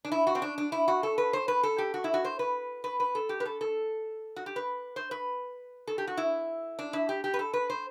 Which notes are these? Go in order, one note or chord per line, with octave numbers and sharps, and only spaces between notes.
D4
E4
F#4
C4
D4
D4
E4
F#4
A4
B4
C5
B4
A4
G4
F#4
E4
F#4
C5
B4
B4
B4
A4
G4
B4
A4
A4
F#4
G4
B4
C5
B4
A4
G4
F#4
E4
D4
E4
G4
G4
B4
A4
B4
C5